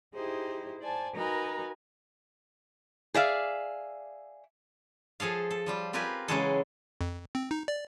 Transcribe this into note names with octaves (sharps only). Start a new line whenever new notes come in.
D#4 E4 G4 G#4 C5
C5 D5 G#5 A5
D#4 F#4 A#4 B4 G#5 A#5
G#4 D5 E5 F5
F3 G#4 A4 F5
A4
F3 G3 F4
C4 F4 G4 A#4 B4 G#5
C#3 E3 F#3 G#3 G#4 A4
F2
C4
D#4
D5